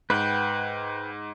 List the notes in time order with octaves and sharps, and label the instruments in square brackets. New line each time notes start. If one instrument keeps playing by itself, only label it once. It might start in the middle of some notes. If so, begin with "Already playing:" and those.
[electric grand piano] G#2 [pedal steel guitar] B4 F#5 G5